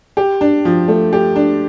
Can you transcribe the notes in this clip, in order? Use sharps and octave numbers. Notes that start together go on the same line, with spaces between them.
G4
D4
F3
A3
G4
D4